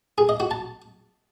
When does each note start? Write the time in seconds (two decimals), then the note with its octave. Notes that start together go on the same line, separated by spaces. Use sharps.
0.18 G#4
0.29 D#5
0.40 F#4
0.51 A5